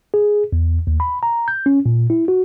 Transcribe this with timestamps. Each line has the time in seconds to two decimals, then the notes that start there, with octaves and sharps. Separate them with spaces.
0.14 G#4
0.53 E2
0.87 D#2
1.00 B5
1.23 A#5
1.48 G6
1.66 C#4
1.86 A#2
2.10 E4
2.28 F#4